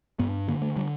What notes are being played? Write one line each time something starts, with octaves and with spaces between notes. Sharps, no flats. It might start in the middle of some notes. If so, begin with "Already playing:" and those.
G2 B3
D3 A#3
A3
D3 G3